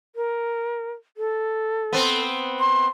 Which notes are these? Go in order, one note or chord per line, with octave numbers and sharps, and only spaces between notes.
A#4
A4
B3 C4
C6